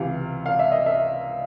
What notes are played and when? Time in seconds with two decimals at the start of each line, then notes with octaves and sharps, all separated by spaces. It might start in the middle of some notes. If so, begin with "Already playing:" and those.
Already playing: C#2 C3 E3 F5
0.46 F5
0.59 E5
0.72 D#5
0.86 E5